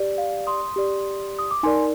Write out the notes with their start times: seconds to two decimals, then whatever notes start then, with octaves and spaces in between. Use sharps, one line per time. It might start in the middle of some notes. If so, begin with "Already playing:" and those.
Already playing: G4 D5
0.18 F5
0.47 C6 D#6
0.76 G4 D5
1.39 D#6
1.51 D6
1.63 D#4 A#4 D5 G#5 C6